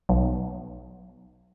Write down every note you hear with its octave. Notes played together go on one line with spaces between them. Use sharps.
B1